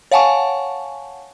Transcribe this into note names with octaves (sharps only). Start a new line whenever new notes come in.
C#5 F5 F#5 G#5 A5 C#6